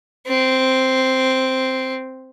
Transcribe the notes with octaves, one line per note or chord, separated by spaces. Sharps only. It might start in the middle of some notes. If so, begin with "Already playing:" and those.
C4